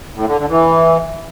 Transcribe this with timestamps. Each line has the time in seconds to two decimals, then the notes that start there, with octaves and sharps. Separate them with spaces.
0.16 A2
0.27 D3
0.38 D3
0.50 E3